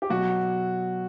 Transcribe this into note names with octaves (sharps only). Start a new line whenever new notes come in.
G4
B2 F#3 F#4